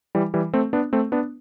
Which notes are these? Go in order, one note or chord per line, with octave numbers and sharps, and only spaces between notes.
E3 G3
E3 G3
A3 C4
B3 D4
A3 C4
B3 D4